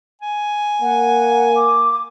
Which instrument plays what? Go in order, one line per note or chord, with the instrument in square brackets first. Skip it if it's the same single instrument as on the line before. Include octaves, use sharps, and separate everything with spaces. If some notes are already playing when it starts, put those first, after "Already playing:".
[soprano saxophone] G#5
[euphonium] A#3 [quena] F#5
[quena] D6